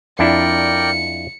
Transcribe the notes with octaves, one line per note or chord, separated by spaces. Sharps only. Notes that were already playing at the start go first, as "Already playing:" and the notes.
F2 D4 E4 A#4 D5 G5 C#7